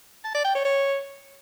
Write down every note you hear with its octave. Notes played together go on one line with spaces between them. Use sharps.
A5
D5
G5
C#5
C#5